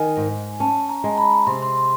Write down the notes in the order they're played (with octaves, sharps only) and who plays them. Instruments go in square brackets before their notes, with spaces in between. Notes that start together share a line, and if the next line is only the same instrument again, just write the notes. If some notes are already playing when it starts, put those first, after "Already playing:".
Already playing: [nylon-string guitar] D#3 [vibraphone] G#5
[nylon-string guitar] G#2
[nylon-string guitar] C#4 [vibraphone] A5
[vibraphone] A#5
[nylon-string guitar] G#3
[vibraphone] B5
[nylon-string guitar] C3 [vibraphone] C6
[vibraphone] C6